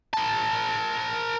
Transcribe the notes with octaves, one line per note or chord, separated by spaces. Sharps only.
A#4 A5